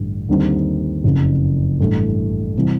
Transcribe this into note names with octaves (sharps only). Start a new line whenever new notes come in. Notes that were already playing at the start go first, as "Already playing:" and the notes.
Already playing: A1 G2 D3
D#2 D3 G3 C4 D#4
F#1 F2 C#3
A1 G2 E3 A3
C3 E3 G3